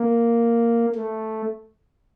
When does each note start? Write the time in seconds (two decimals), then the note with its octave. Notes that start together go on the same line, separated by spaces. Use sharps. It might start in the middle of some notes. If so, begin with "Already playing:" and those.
Already playing: A#3
0.96 A3